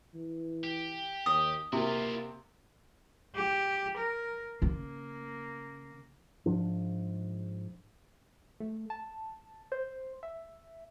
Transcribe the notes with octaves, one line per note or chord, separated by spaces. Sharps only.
E3
G4
D#2 D#6
C3 A#3 E4 F4
G4
A#4
C#3 A#3
G#2 F3 D4
A3
A5
C5
E5